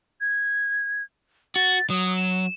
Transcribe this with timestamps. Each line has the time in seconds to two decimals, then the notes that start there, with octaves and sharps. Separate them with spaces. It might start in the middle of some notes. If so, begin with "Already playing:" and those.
0.21 G#6
1.56 F#4 A6
1.90 F#3 D#6
2.17 E7